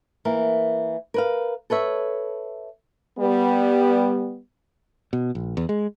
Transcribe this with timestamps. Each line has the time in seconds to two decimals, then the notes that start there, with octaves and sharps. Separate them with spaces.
0.25 E3 A#3 A#4
1.14 A#4 B4 F5
1.70 A4 B4 C#5 E5
3.18 G3 B3
5.13 B2
5.35 A#1
5.57 E2
5.69 G#3